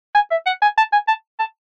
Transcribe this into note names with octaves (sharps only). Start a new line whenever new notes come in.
G#5
E5
F#5
G#5
A5
G#5
A5
A5